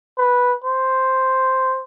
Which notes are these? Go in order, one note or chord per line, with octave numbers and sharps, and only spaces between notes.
B4
C5